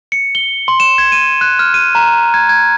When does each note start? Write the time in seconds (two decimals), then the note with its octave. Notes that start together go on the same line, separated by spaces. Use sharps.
0.12 C#7
0.35 G7
0.68 C6
0.80 E7
0.98 G#6
1.12 D#7
1.41 F#6
1.59 F6
1.74 D#7
1.95 A#5
2.34 G#6
2.49 G#6